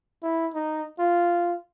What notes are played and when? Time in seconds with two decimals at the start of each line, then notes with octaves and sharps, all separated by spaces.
0.23 E4
0.54 D#4
0.99 F4